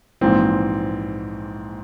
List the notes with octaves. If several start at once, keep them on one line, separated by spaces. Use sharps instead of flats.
A#1 G#2 E3 C4